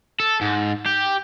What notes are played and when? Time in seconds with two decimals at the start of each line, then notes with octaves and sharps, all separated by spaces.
0.20 A4
0.41 G#2
0.86 G4